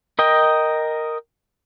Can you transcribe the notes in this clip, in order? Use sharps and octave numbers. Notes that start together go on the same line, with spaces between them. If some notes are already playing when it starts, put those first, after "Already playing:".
A#4 D#5 G5